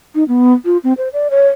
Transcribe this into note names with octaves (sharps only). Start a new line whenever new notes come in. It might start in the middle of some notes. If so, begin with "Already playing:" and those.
D#4
B3
F4
C4
C5
D5
C#5